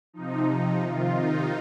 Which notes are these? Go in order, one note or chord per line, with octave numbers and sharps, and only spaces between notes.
C3 F3 D#4
C3 D#3 F4
D#4